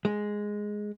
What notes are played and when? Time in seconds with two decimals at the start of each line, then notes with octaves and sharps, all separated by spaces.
0.05 G#3